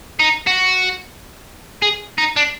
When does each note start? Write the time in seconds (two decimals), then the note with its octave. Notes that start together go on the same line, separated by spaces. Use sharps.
0.20 D#4
0.47 F#4
1.82 G#4
2.18 D#4
2.36 D4